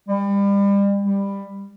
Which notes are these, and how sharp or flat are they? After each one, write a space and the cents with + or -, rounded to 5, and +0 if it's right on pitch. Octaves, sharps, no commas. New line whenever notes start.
G3 +35
G3 +15